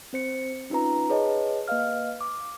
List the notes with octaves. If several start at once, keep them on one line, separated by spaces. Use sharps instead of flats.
C4 C5 C#7
C#4 D#4 F4 B4 A#5
G#4 B4 C#5 D#5 F#5 A5
A#3 B4 D#5 F5 F6
D6